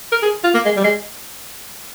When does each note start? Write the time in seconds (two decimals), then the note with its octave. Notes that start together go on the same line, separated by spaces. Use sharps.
0.12 A#4
0.22 G#4
0.44 F4
0.54 A#3
0.65 G#3
0.76 G3
0.84 G#3